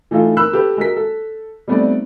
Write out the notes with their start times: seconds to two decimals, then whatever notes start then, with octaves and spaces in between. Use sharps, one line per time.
0.11 E3 A3 D#4 F4 A4
0.37 A#4 B5 E6 F#6
0.53 G4 A4 B4
0.77 G#3 F#4 A#4 B6
0.96 A4
1.68 G3 A3 B3 C4 D#4 D5